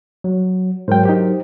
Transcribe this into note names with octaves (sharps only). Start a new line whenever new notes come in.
F#3
G#2 F#3 A#4 C5 G5
D#4 G4